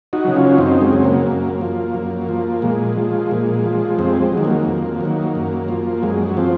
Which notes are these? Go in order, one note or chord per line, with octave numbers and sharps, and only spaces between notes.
D#4 F#4
C#3 F#3
C#4 F4
F#2 C4 D#4
G#3 C4
C#3 F#3
A#3
F#2
F3
F#2
F3
A#2 G#3
F3
A#2
F3
F2 G#3 C4
G#3
F#3
D#3
A#3
F2
D#3 F#3
F#2
F3
F#2 G#3
F3 C4